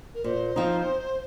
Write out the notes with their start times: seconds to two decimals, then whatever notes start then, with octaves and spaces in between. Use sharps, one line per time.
0.15 A#4
0.24 A#2 C5
0.56 F3 C4 D#4